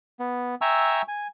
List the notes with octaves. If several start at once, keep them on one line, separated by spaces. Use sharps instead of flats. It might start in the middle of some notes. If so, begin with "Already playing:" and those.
B3
E5 G5 G#5 A#5 C#6 E6
G#5